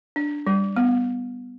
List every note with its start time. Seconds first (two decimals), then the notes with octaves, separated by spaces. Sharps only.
0.16 D4
0.47 G3
0.76 B3